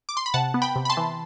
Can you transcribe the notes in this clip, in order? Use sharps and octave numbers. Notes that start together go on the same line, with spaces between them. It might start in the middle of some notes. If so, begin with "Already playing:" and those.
D6
C6
B5
C3 F#5 A5
B3
G5 B5
C3
B5
A5 C6
E3